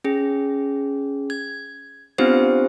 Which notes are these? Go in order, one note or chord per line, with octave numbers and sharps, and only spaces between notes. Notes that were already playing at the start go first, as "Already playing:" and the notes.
C#4 G#4
G#6
B3 C4 D4 F4 G4 C5